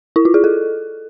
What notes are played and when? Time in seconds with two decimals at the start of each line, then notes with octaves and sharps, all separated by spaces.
0.16 E4
0.25 F4
0.34 G#4
0.44 A4